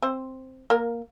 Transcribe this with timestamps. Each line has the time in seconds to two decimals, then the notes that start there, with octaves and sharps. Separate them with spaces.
0.02 C4 C5
0.70 A#3 A#4